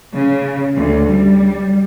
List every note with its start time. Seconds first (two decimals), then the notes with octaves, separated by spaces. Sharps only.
0.16 C#3
0.76 D2
1.11 G3